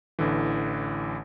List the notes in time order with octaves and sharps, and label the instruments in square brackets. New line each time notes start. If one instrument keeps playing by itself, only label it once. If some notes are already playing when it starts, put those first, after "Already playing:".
[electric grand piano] A1 D3 E3